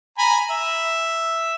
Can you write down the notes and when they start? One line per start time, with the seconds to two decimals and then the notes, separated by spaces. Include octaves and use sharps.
0.18 G#5 A#5 B5
0.51 E5